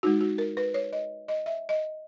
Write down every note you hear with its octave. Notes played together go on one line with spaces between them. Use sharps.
G#3 D#4 F#4
F#4
A#4
B4
C#5
D#5
D#5
E5
D#5